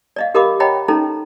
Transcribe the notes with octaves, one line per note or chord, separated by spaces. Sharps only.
D5 D#5 F5
G4 A#4 D#5 F5 B5 D6
C#5 D#5 F#5 G5 A#5 B5
C#4 D#4 A4 A#5